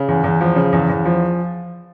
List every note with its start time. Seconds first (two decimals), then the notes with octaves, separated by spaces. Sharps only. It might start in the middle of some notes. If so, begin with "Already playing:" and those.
Already playing: C#3
0.08 E2
0.24 E2
0.41 F3
0.56 C#3
0.72 E2
0.89 E2
1.05 F3